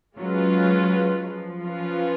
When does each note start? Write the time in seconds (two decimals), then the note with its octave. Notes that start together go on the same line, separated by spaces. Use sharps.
0.17 F#3 G#3 C#4 F4 B4
1.26 F3
1.62 C#4 F4 B4